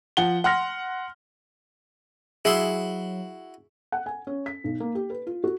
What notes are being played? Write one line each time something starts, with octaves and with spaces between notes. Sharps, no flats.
F3 F#5 G7
F#5 C6 F6 A#6
F#3 E4 F#4 G#4 E5 C6
F#5
G#5
C#4
B6
B1
A#3
G4
B4
F4
F#4